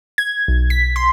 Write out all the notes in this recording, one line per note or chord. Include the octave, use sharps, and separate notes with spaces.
G#6
B1
B6
C6